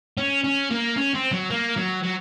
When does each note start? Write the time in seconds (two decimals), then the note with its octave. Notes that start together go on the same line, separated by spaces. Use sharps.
0.18 C#4
0.44 C#4
0.71 A#3
0.97 C#4
1.15 C4
1.32 F#3
1.50 A#3
1.76 F#3
2.03 F#3